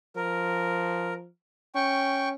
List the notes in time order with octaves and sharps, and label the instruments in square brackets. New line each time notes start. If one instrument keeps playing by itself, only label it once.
[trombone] F3 [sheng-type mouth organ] A#4
[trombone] C#4 [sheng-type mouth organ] G5 C#6